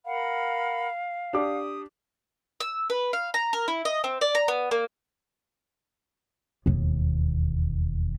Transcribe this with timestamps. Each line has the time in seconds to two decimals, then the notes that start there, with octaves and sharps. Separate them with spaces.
0.05 A#4 F5 F#5 B5
1.33 D4 G4 D6 D#6
2.60 E6
2.90 B4
3.13 F5
3.34 A#5
3.53 A#4
3.68 E4
3.85 D#5
4.04 C4
4.21 D5
4.35 A#5
4.48 B3
4.71 A#3
6.66 E1 D#2